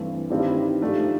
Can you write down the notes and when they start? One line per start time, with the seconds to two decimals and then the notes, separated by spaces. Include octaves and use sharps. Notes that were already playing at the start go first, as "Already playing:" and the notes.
Already playing: G2 E3 A3 C4
0.30 G2 D#3 G3 C4 E4
0.81 G#2 F3 A3 D4 G4